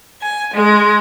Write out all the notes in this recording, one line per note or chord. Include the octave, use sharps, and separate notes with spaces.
G#5
G#3